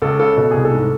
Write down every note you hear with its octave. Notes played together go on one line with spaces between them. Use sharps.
C#2 A4
C#3 A4
B2 A4
C2 G#4
A4
G#2